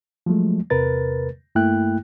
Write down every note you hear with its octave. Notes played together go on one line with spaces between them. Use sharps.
F3 F#3 G#3 A3
E2 C3 A#4 B4 A6
G2 A3 A#3 E4 G5 F#6